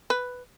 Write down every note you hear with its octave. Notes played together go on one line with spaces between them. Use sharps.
B4